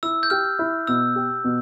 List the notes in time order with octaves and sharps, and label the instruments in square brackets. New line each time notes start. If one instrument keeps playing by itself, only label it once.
[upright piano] E4 [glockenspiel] E6
[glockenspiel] G6
[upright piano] G4 [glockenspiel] F6
[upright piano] E4
[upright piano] B2 [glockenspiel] E6
[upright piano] G4
B2